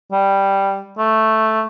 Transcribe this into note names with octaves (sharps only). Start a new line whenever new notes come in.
G3
A3